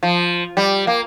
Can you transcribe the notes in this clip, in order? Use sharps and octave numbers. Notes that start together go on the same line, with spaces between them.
F3
G3
A#3